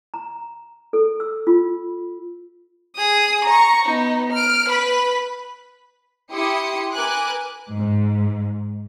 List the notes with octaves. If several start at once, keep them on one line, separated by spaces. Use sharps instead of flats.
A#5
A4
E6
F4
G#4 D#6
A#5 C#6
B3 D#4
F6 D7
B4 B5
E4 G4 C6 D#6 C#7
A#4 B4 G#5 D6 F#6
G#2